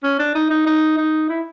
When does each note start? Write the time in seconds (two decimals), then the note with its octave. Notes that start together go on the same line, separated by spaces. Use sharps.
0.03 C#4
0.19 D4
0.35 D#4
0.51 D#4
0.66 D#4
0.97 D#4
1.29 E4